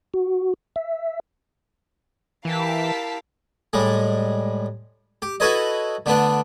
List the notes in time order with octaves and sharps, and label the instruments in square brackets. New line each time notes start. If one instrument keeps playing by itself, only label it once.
[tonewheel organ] F#4
E5
[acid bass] E3 [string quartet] E4 A#4 F5 [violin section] G4 A5 B6
[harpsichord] A2 G3 G#3
G4
E4 F#4 A4 B4 C#5 D#5
D3 A3 B3 D4